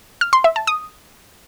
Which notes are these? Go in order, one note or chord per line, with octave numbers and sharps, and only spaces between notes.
F6
C6
E5
A5
D#6